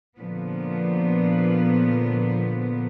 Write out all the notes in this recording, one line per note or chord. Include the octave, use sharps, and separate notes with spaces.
A#2 D3 F3 B3